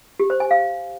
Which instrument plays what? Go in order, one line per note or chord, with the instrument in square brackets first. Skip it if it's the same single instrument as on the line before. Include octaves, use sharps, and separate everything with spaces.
[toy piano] G4
C5
G#5
F5